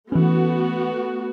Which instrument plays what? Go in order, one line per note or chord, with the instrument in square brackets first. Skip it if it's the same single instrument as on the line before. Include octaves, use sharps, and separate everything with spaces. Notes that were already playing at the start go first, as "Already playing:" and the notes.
[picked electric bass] E3 C#4 [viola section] A3 B3 F#4